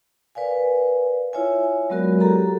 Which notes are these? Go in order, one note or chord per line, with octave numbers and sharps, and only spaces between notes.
A#4 B4 D5 F5 G#5
E4 F4 C#5 E5 G#5
F#3 G#3 B3 F#4 A#4 D5
F#4 G4 A4 A#5